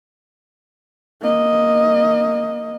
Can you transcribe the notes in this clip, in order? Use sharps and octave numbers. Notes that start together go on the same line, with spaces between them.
A#3 D#5